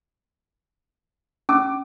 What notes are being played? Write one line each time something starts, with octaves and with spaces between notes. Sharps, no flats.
C#4 D6